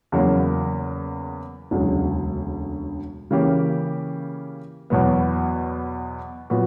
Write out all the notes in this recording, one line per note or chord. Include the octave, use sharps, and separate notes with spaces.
E2 C#3 F#3 A#3
E1 D2 C#3 F#3
C#3 E3 A#3 C#4 G4
E2 B2 F#3 B3
A#2 F#3 B3 F#4